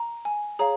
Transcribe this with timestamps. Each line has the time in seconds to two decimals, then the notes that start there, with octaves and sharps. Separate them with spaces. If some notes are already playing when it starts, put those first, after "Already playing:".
Already playing: A#5
0.25 G#5
0.59 G#4 C#5 F5 A#5